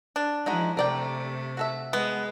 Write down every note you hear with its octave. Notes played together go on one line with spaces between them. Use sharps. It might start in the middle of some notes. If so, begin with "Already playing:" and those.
D4
F3 G#3 D#4 E4 F#4
C3 A3 A#4 D5 G5
F#4 A4 E5
G#3 B3